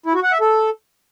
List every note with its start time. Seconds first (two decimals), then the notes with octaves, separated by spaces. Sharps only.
0.06 E4
0.15 F#4
0.23 F#5
0.32 E5
0.41 A4